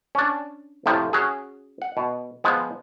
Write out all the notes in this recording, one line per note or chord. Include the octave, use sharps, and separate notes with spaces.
C#4 D4
F2 A2 C3 F3
C#4 F#4 G#4
F#5
B2
F3 G#3 B3